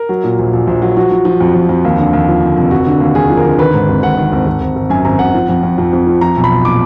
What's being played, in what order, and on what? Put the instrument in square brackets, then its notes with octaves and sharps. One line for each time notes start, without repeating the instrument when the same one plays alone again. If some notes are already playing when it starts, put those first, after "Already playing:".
Already playing: [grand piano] A#4
F#3
A#2
A#1
A#1
A#1
F#3
F3 F#4
F3
F3
F2
F2
F2
D#2
D3
D#2
F3
D3
F1
F1 F#4
D3
D#2
D#2 G#4
F3
A#4
D3
D#3 B4
G#2
G#1
G#1 F#5
D#3
G#1
G#1
G#1
G#1
F#2 G#5
G#1 A#5
G#1 F#5
F3
F2
F2
F2
F2
F3
F3 A#5
B1
B5
B1
A#2 D6